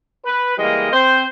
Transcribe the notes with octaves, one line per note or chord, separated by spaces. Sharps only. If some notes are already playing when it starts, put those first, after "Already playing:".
B4
E3 G3 G#3 A#3 D#5
C4 C5